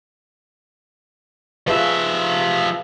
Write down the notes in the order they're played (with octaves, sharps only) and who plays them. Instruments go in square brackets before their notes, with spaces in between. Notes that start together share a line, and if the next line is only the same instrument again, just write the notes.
[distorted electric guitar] F3 E5 [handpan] F4 G#4 B4